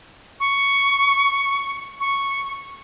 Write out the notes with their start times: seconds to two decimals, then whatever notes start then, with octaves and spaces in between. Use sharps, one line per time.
0.40 C#6
2.00 C#6